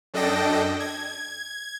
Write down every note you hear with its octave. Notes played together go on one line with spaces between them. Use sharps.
F#2 D4 A4 D#5 G5 A#6
G#6